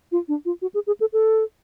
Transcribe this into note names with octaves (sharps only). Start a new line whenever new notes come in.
F4
D4
F4
F#4
G#4
G#4
A4
A4